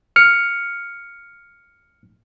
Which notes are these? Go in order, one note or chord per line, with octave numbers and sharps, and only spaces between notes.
F6 C#7